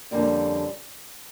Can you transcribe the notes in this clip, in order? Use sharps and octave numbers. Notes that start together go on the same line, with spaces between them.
F2 D3 G3 A#3 C#4